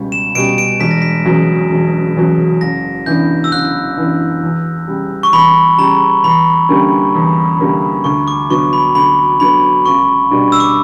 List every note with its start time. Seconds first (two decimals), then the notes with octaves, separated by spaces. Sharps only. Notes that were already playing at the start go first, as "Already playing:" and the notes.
Already playing: C#2 B2 G3 C#4
0.12 E7
0.35 B2 G3 C#4 D7
0.58 D7
0.80 E1 B6
0.91 A#6
1.02 B6
1.25 E2 C#3 F#3
1.71 E1
2.16 E2 C#3 F#3
2.61 F#1 A#6
3.06 F#2 E3 B3 D4 G6
3.44 E6
3.52 F#1 F#6
3.97 F#2 E3 B3 D4
4.43 E2
4.87 C#3 G3
5.23 C#6
5.33 E2 B5
5.78 C#3 G3 A#5
6.24 E2 B5
6.69 D3 G3 A#3 C#4
7.15 E2
7.59 D3 G3 A#3 C#4
8.04 D2 C#6
8.28 D6
8.50 D3 F#3 B3 C#6
8.73 B5
8.95 D2 B5
9.40 D3 F#3 B3 B5
9.86 C#2 C#6
10.31 B2 G3 B3 D4
10.52 E6
10.60 D6